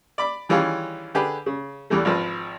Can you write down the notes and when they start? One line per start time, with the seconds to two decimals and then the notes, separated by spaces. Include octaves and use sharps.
0.18 D5 B5 D6
0.49 D#3 E3 G3 C#4 F4 G#4
1.15 D3 G4 G#4 B4
1.46 C#3
1.90 E2 E3 G3 A3
2.05 G#1 F3 B4